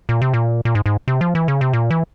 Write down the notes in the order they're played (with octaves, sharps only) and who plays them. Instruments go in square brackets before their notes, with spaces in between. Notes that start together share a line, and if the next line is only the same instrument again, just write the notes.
[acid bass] A#2
C3
A#2
A#2
G#2
G#2
C3
F3
E3
C#3
C3
A#2
E3